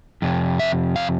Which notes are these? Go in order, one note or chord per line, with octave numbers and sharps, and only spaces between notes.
F2 C3
E5
F5